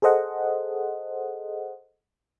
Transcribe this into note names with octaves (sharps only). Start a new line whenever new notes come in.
G#4 A4 C5 D#5 F#5